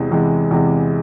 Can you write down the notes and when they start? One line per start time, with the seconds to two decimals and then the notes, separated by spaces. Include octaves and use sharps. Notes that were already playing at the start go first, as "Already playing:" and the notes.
Already playing: E2 C3 E3 G#3
0.11 E2 C3 E3 G#3
0.51 E2 C3 E3 G#3